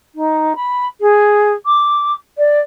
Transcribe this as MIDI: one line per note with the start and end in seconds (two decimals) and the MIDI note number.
0.15 0.52 63
0.55 0.85 83
1.00 1.52 68
1.65 2.12 86
2.37 2.60 74